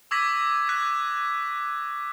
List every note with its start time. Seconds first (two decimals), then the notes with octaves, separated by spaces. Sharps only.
0.11 C#6 D6 E6 G#6 A#6 B6
0.69 F#6 G#6 B6